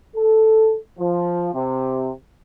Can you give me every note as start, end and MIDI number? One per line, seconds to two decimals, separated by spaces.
0.16 0.77 69
0.99 1.50 53
1.54 2.11 48